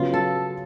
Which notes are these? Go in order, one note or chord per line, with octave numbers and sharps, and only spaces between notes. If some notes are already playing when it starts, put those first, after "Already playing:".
Already playing: C#3 F#3 B3 F4
A4